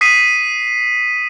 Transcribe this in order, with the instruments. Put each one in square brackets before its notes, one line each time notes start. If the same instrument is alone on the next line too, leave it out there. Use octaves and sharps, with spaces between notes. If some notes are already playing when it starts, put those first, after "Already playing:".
[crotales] D#6 B6 C7 D#7